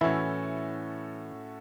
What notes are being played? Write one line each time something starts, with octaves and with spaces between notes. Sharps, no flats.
A2 E3 A3 C#4 E4 F#4 A4